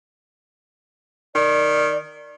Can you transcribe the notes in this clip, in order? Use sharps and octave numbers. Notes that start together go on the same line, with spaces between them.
D#3 D5